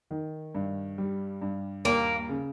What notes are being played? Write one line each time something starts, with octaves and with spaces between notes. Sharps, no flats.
D#3
G2
G3
G2
D#2 A#3
C#3